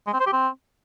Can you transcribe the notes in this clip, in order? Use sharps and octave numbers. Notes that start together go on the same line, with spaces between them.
G#3
C4
C5
G4
C4